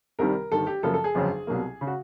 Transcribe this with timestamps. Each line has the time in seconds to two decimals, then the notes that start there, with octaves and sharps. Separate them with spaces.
0.19 C2 C3 D#3 G3 A#4
0.52 G1 G2 D#3 A4
0.67 G4
0.83 F#2 C#3 F3 A#3 A4
0.94 A4
1.04 G#4
1.15 G1 F2 C#3 F#3
1.47 C2 B2 F#3 A#3
1.81 C#3
1.87 F#4